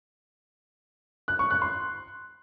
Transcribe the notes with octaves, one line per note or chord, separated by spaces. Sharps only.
F#6
C#6
F#6
C6